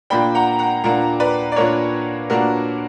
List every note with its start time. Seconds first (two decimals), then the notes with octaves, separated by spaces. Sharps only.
0.10 A#2 A#3 D4 G5 B5
0.35 F#5 A#5
0.59 F#5 A#5
0.84 A#2 A#3 D4 F#5 A#5
1.20 B4 D5
1.52 D5
1.56 A#2 A#3 D4 A#4 C#5
2.30 A#2 A#3 D4 F#4 A#4